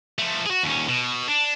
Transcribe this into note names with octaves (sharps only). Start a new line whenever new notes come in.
F3 A3
F#4 G#4
D#2 C#4
B2
D4